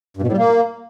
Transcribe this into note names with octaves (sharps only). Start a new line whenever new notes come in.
G2
B2
A2
G3
A#3